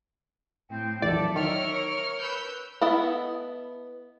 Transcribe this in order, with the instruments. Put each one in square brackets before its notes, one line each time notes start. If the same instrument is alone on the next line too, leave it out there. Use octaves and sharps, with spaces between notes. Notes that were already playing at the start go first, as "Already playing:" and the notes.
[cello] A2 C4 [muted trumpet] G5
[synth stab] A#1 E2 D5 [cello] F#3 A4 [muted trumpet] E5
[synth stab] D#3 [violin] A#4 F6 [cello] C#5
[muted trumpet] B4 [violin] E6 G6
[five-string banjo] B3 E4 A4 D#5 F#5